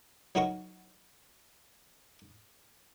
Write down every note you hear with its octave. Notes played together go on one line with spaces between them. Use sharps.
F#3 D#4 F#4 A#4 C#6